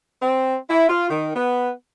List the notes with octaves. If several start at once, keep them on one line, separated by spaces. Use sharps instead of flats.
C4
E4
F4
D#3
B3